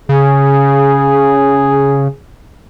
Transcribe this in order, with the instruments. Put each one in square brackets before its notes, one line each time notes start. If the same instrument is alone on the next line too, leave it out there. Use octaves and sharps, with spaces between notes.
[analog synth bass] C#3 [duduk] G#4